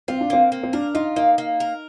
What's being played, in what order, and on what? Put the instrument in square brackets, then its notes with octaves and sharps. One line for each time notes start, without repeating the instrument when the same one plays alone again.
[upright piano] C4 [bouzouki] F4
[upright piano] D4
[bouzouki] A#3 [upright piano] C4
[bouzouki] A#3
[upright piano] C4
[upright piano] D4 [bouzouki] A#4
[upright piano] D#4 [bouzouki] F4
[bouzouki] A#3 [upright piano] D#4
[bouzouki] A#3
A#4